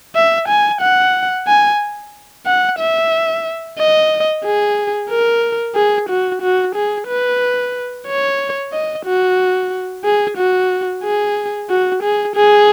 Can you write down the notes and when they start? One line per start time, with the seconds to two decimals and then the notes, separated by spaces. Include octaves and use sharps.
0.15 E5
0.48 G#5
0.81 F#5
1.47 G#5
2.46 F#5
2.79 E5
3.78 D#5
4.45 G#4
5.10 A#4
5.75 G#4
6.09 F#4
6.42 F#4
6.75 G#4
7.07 B4
8.07 C#5
8.72 D#5
9.06 F#4
10.04 G#4
10.38 F#4
11.04 G#4
11.69 F#4
12.03 G#4
12.36 G#4